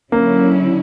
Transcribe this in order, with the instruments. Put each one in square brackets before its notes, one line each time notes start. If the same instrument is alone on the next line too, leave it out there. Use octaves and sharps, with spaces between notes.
[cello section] D3 F#3 C#4 E4 [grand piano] A#3